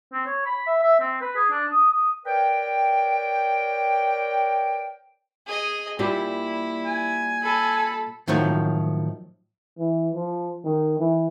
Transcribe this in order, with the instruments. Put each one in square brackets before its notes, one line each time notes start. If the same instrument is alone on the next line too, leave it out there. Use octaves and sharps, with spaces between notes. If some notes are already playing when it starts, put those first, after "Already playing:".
[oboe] C4
C#5
B5
E5
E5
C4
B4
G#4
D4
D#6
D#6
[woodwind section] A#4 B4 C#5 D5 G5
[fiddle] G#4 D#5
[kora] A#2 G3 G4 [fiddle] E4
[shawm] G#5
[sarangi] A4 [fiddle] B5
[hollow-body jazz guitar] A2 D#3 F3 F#3 D#4
[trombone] E3
F3
D#3
E3